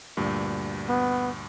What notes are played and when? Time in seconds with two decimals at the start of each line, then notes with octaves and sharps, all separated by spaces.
0.17 D2 G2 A#2
0.89 B3